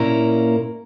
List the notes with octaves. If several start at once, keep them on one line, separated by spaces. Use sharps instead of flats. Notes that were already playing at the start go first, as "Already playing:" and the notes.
Already playing: A#2 A#3 C#4 E4 A#4